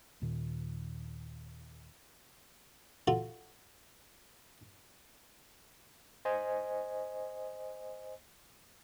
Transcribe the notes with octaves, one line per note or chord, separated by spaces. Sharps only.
D#2 A#2 D#3
F4 F#4 A4
C5 D#5 G#5